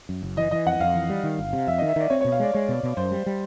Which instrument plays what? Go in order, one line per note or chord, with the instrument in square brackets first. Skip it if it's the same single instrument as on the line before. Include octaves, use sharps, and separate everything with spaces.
[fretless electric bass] F#2
F#1
[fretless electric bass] E3 [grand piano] D#5
[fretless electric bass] E3 [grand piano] D#5
[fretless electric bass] F2 [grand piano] F#5
[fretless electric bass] F2 [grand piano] F5
[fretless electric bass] E3
G3
D#3
G1
C3
[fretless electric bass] F2 [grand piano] E5
[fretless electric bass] D#3 [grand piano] D#5
[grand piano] E5
[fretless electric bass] D#3 [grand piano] D5
[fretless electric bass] C4 [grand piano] C#5
[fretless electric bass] B2 [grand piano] C#5
[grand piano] F5
[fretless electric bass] G#3 [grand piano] D5
[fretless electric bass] G#3 [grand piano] C#5
[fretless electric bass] B2
B2
[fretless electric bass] F#2 [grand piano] C5
[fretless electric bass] G3
G3